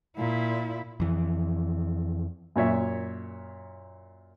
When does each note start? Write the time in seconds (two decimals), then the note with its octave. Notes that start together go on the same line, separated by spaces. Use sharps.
0.17 A#2 E4
1.00 F2 E3
2.56 F#2 A#2 C#5 E5